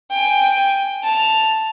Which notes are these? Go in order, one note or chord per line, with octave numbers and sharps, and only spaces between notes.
G5 G#5
A5 F7